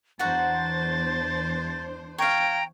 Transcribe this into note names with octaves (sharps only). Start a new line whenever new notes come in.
E2 D4 F#4 C5 F#5 A#5 A6
C#5 F5 G5 A#5